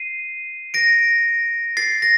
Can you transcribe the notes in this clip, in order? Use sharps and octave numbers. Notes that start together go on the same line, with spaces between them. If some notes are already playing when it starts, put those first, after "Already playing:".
Already playing: C7 D#7
A#6 D7
A6 C7
A#6